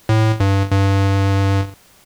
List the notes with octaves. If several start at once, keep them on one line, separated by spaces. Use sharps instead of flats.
A2
G2
G2